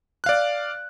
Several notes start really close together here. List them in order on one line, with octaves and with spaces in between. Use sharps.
F#6 F5 D5